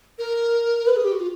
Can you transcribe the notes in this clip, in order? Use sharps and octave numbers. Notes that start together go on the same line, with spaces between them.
A#4
B4
G#4
G4
F#4
F4